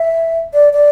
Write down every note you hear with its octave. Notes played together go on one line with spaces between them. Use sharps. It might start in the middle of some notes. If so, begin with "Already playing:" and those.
Already playing: E5
D5
D5